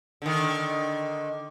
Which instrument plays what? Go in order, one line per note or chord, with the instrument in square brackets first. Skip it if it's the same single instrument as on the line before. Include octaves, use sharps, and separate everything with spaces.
[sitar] D3 D#3